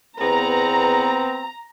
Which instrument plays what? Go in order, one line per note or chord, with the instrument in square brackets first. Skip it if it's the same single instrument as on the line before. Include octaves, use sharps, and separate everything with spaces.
[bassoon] E2 [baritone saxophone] B3 [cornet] C4 [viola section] A#5